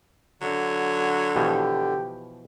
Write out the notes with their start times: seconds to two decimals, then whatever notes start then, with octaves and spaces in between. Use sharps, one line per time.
0.41 D3 F#3
1.36 B2 E3 F3 G4